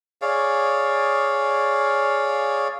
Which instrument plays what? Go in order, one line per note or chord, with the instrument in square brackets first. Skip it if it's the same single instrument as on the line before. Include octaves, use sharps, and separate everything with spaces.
[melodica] G#4 C#5 D5 F5